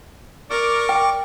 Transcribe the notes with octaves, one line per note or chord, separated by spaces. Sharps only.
A#4 D5 C#6 D6
G5